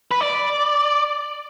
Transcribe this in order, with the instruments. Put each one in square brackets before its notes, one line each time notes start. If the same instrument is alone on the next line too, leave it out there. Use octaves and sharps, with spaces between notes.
[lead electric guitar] B4
D5